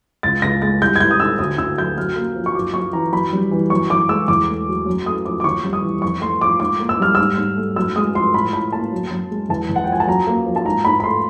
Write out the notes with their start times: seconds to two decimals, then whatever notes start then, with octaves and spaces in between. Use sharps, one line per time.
0.23 C#2 A6
0.42 C#2 A#6
0.62 G#3 A6
0.82 C2 G6
0.96 G#6
1.00 C2 G6
1.11 D#6
1.20 D#3 E6
1.39 D2 D#6
1.58 D2 E6
1.78 F#3 G6
1.97 F#2 F6
2.16 A#3
2.36 F3
2.46 C#6
2.55 F#2 D6
2.74 F#2 C#6
2.93 E3 A#5
3.12 F#2 B5
3.33 G3
3.51 E3
3.70 F#2 C#6
3.90 F#2 D6
4.09 G#3 E6
4.28 E2 D6
4.48 A3
4.68 F#3
4.86 F#2
5.06 A3 D#6
5.25 F3 D6
5.40 D6
5.44 D#2 C#6
5.64 G3
5.73 D#6
5.84 E3
6.02 F2 C#6
6.21 A3 C6
6.41 F3 D6
6.60 G#2 D6
6.80 A#3
6.89 E6
7.00 G3 F6
7.15 G#2 E6
7.37 G#2
7.56 A3
7.76 F#2 E6
7.96 G#3 D#6
8.14 F3 C6
8.34 A2 B5
8.53 A2 B5
8.72 A#3 A5
8.92 F#2
9.11 F#2
9.31 G#3
9.49 E2 A5
9.69 E2
9.76 F#5
9.84 G5
9.88 F3 G#5
10.00 A5
10.07 F#2 A#5
10.27 A#3
10.46 F3
10.56 A5
10.66 G#2 A#5
10.85 G#2 B5
11.00 B5
11.04 A3 C6